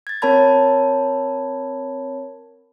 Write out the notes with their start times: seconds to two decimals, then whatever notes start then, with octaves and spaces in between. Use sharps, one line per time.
0.07 G#6 A6
0.22 C4 A#4 C#5 A5 B5 G#6